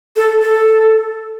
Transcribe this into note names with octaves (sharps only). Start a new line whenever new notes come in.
A4
A4